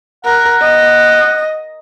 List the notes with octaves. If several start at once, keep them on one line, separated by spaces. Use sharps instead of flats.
A#4 F#5
D#5